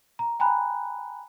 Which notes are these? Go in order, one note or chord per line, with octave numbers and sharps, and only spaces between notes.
A#5
G5 G#5 A#5 B5 F#6